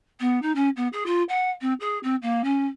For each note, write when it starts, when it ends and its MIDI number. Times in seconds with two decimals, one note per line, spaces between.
0.20 0.39 59
0.42 0.54 63
0.55 0.69 61
0.77 0.88 59
0.93 1.06 68
1.06 1.23 65
1.29 1.51 78
1.61 1.73 60
1.80 1.99 68
2.03 2.16 60
2.22 2.42 58
2.44 2.66 61